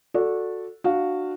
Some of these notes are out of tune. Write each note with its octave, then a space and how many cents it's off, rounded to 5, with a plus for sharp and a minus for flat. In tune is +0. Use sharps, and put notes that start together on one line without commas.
F#4 -20 A4 +0 D5 +0
D4 +30 F#4 -5 F5 +0